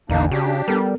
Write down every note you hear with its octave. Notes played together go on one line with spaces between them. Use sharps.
A1 E2 D3 A#3 D4 D#4
C#3 D4 F#4 G4
G3 B3 A4 A#4